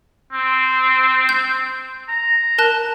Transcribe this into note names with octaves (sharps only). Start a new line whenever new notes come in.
C4
C6 G6
A#5
A#4 A5 F#6